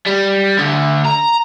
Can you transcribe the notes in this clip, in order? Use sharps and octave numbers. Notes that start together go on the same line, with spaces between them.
G3
D2 D3
A#5